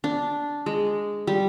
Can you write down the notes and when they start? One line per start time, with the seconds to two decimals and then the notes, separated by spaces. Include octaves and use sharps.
0.04 D4
0.66 G#3
1.27 G3